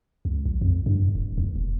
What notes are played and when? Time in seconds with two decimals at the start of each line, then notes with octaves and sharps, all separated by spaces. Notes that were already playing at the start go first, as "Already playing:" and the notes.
0.25 C#2
0.45 A#1
0.61 F2
0.86 G2
1.15 D#1
1.38 D#2
1.56 E1